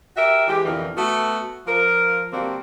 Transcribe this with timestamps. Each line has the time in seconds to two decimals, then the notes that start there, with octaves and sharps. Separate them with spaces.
0.16 F#4 G4 A#4 E5
0.48 E3 G#3 G4
0.65 F2 B2 D3 E3 A#4
0.96 A3 B3 F#4
1.67 F3 A#4
2.32 D3 G3 A#3 C4 F#4